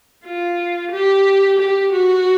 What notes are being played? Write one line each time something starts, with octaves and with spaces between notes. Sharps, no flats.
F4
G4
G4
F#4